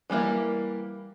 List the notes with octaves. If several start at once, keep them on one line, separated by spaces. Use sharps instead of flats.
E3 G3 A#3 E4